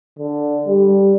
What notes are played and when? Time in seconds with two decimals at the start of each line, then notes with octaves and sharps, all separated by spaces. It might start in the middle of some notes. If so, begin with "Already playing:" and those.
0.19 D3
0.67 G3